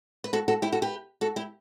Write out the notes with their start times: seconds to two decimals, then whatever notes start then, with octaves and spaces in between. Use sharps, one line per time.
0.24 B4
0.33 F#4 A4
0.48 F#4 A4
0.62 E4 G4
0.72 F#4 A4
0.82 G4 B4
1.21 F#4 A4
1.36 E4 G4